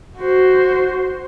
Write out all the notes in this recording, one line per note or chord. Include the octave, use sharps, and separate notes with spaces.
F#4 C5